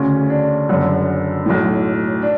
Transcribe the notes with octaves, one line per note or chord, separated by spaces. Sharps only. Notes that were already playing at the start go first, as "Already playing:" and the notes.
Already playing: D2 C#3 C#4
D4
F#1 F#2 D3
B1 A2
D4